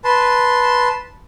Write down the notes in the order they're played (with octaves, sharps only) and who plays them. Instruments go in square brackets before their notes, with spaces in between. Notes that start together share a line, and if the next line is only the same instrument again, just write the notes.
[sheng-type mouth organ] B4 A5 C6